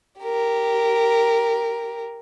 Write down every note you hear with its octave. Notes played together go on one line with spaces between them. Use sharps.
G4 A#4